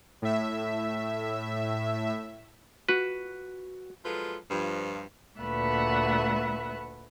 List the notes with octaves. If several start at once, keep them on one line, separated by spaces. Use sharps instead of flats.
A2 E5
F#4 B4
F3 F#3 G#3 F4 A4 B4
G2 F3
D2 A#2 A3 B4 E5 F#5